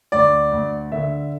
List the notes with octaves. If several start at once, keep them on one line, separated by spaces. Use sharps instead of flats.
D2 D5
D2
D3 E5